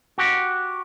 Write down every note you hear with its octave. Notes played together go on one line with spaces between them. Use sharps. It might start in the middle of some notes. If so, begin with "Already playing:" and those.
F#4 G4